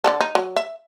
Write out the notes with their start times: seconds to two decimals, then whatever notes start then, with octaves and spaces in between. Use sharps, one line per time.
0.04 D3 G3 A4
0.21 D#4
0.35 F#3
0.56 E5